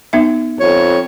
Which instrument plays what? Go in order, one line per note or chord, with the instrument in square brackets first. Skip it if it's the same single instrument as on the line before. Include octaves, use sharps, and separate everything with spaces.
[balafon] B3 D#4 E5
[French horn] F2 [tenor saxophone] C#5